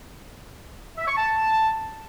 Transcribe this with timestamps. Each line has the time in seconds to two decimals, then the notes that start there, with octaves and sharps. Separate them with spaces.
0.98 E5
1.07 C#6
1.17 A5